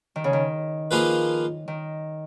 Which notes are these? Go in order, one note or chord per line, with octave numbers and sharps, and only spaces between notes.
D#3
C#3
D#3
F3 A#3 F4 G#4 B4
D#3